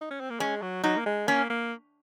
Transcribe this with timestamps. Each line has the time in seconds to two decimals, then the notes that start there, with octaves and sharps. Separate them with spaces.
0.01 D#4
0.11 C#4
0.20 C4
0.30 A#3
0.40 G#3 C#4
0.62 F#3
0.84 F#3 D#4
0.97 A#3
1.06 G#3
1.28 A#3 C#4
1.50 A#3